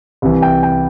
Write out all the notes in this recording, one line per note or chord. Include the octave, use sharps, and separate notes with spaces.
C2 C3 E3
G5
G5